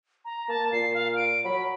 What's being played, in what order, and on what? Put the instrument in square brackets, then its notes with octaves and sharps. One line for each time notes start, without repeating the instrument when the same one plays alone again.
[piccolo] A#5
[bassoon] A#3 [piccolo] A5
[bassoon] A#2 [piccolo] C7
[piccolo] F5
D7
[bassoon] F#3 [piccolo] B5